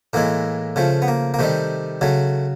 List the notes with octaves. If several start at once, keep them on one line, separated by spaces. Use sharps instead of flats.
A2 E3 G#3 A#3
C#3 F3 A3
B3
A#3
A#3
C3 D#3 G3 A3
C#3 F#3 A3